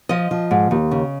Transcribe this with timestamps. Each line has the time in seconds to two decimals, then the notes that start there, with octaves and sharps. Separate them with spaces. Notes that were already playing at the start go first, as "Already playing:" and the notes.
0.09 F3 D#5
0.31 F3
0.51 G#2
0.71 D#2
0.91 C#3